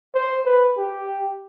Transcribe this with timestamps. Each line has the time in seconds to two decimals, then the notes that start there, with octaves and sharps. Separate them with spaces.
0.15 C5
0.46 B4
0.77 G4